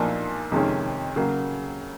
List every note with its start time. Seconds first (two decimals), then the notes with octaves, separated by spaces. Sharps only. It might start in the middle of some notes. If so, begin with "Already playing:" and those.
Already playing: B1 A#2 F3 A#3 D4
0.52 F2 C3 D#3 G#3 C#4
1.16 C#3 F#3 A#3